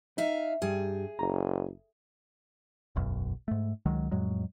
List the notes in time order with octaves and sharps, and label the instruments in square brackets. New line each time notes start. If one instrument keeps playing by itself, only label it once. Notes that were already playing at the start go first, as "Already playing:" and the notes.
[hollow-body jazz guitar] D#4 [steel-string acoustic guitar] E5 F5
[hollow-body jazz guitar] G2 G3 [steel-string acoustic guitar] G#4
[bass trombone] F#1 [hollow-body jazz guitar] A#5
[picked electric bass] E1 B1 F#2
G#2 A3
C#2 D#3 F#3 G#3
F2 A2 F#3 G#3